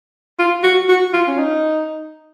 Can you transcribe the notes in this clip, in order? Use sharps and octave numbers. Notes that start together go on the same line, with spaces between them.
F4
F#4
F#4
F4
C#4
D#4